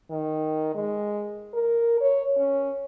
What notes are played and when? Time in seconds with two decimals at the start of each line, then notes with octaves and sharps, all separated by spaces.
0.10 D#3
0.75 G#3
1.54 A#4
2.01 C#5
2.37 C#4